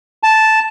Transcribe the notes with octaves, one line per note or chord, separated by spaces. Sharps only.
A5